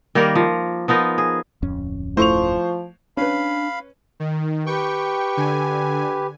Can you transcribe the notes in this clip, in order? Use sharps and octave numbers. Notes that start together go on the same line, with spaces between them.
D#3 G3 A#3 A#4
F3
F3 B3 D#4 A#4
G#4
D1 F2 C#4
F3 A3 E4 A4 C5 C#6 F7
C#4 D4 B4 F5 B5
D#3
G4 B4 G5 C#6
D3 G#5